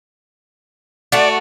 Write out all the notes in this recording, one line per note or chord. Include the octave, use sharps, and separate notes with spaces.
A3 F#4 D5